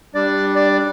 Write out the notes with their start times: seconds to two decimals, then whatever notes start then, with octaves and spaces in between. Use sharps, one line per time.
0.15 G3 D4 D5
0.56 D5